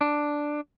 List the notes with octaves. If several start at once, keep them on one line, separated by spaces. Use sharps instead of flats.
D4